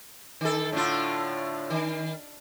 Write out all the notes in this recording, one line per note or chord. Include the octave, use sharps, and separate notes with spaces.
D#3 A4
A2 D3 F4
D#3